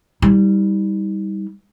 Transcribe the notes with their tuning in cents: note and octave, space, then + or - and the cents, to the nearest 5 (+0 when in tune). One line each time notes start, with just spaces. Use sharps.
G3 +0 D#4 +40